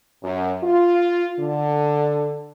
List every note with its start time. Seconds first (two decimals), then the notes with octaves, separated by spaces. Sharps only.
0.23 F#2
0.62 F4
1.39 D3